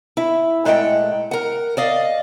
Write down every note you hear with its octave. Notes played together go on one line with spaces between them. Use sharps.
E4
A#2 G#3 A3 F#5 G5
A#4 F#5
D5 D#5 F5